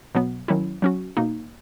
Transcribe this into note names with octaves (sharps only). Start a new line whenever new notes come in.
B2 F#3 B3
D#3 F#3 C#4 E4
F#3 C#4 F#4
B2 A#3 D#4